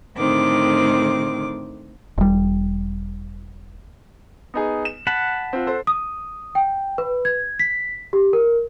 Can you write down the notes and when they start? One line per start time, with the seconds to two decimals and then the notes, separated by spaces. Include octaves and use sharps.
0.17 A2 D3 D#3 C4 D6
2.18 E1 G3
4.54 B3 D#4 G#4
4.85 E7
5.07 F#5 A5 B5
5.53 C4 F4
5.67 A4 C5
5.87 D#6
6.55 G5
6.98 B4
7.25 G#6
7.59 B6
8.13 G4
8.33 A#4